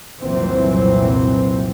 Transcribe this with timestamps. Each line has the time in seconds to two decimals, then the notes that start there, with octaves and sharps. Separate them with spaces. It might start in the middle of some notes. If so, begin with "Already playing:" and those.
0.21 F1 C2 A#2 E3 F#3 C4